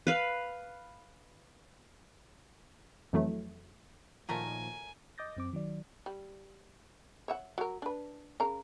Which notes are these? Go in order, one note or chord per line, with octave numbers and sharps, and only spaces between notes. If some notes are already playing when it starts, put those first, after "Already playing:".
B4 F5
F2 E3 F#3 A3
A#2 D#3 F3 F#3 A3 A#4 G#5
D#5 D6 D#6 G6 A6 A#6
F#2 C4 D6
D#3 F#3 D5
G3
C#5 E5 F#5
F#3 A#4
D4 B4
C#3 A#4 A#5